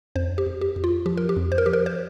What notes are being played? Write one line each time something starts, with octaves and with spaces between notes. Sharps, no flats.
F2 C5
G4
F2
G4
F2
F4
F3 G4
A#4
G4
F2
C5
A#4
F3 G4
A#4
C5